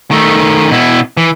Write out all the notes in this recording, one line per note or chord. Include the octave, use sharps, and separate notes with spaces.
D#3 A3
B2 E4
E3